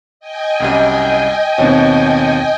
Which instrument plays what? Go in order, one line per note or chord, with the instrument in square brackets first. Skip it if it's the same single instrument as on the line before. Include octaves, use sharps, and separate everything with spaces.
[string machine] D#5 G5 G#5
[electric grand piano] C2 F#2 G3
[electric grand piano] D#2 B2 [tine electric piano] C4 C#5